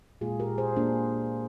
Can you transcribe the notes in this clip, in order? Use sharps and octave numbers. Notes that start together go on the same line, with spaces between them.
A#2 G#3 F4 G#4
G4 A#4
G#4 C5
A#3 D4